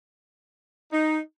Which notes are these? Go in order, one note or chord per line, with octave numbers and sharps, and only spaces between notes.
D#4